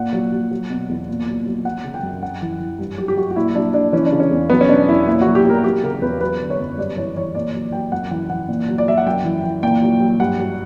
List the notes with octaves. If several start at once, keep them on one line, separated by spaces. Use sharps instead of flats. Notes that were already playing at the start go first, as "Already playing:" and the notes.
Already playing: A#2 F#5
F#3
F#3
F#3
B2
E2
A#2
F#3
F#3
F#3 F#5
C#3
G5
F#2
F#2 F#5
E3
E3
G2
F#3 G4
G4
F#3 F#4
F#4
A#2 E4
F#3 D4
F#3 D4
E3 C#4
D4
C#3
C#4
E2
F#3 B3
C#4
B2 D4
E2 E4
A#2 E4
F#4
F#3
G4
F#3 A#4
F#3 G4
C#3 A#4
E2 B4
F#3 B4
D3
C#5
F#2
G2 D5
E3 C#5
E3 C#5
A#2 D5
F#3
F#3 G5
F#2 F#5
E3 F#5
E3 F#5
A#2
F#3
D5
F#3 E5
F#5
F#2 G5
E3
E3
A#2 G5
F#3
F#3
G2 F#5
F#3